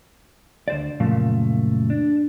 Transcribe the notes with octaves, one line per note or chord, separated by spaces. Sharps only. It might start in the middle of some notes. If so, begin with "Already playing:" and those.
D2 C5 D5
F#2 A#2 C#3 F3 A3
D4